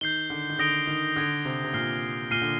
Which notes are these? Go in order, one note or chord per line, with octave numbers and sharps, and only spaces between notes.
D#3 G6 C7 G7
D3
D#3
D3 D#6 A#6 D7 G7
D#3
D3 D#6 G#6 D7
C3
C3
A#2 F6 C7 G7
A#2 F6 C7 D#7 G7
D3